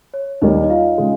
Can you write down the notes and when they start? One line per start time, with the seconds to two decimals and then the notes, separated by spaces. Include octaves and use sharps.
0.14 C#5
0.42 D#2 D#3 G3 A#3 D#4 D#5
0.64 D#5
0.70 F4 F5
0.98 C#3 G#3